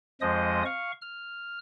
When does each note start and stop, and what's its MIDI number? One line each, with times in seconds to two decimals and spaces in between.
0.21 0.63 41
0.21 0.63 53
0.21 0.63 56
0.21 0.63 72
0.21 0.63 75
0.21 0.63 87
0.65 0.92 77
0.65 0.92 85
1.02 1.59 89